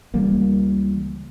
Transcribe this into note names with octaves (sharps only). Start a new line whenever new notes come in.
C#2 E3 G3 A#3